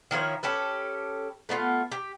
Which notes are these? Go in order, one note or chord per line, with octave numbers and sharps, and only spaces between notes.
D#3 F3 E4 C#5
C#4 G4 A4 B4
A3 B3 D#4 F4
G4